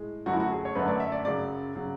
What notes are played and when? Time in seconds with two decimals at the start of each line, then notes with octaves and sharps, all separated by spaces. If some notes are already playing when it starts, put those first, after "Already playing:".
Already playing: A2 G#3
0.26 F#2 D3 F#3 A3 F#4
0.33 E4
0.40 F#4
0.51 G#4
0.65 C#5
0.75 F#2 D3 F#3 A3 B4
0.88 D5
1.00 E5
1.12 D5
1.24 F#2 C#3 F#3 D5
1.75 C#3 F#3